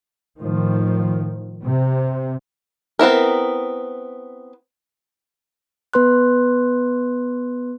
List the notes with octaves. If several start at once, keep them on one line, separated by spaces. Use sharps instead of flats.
A2 D#3 F3
C3
B3 C4 E4 A#4
B3 B4 C6 F#6